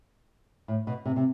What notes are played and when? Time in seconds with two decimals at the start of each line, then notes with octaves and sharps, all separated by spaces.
0.68 A2
0.87 B2
1.06 C3
1.16 C3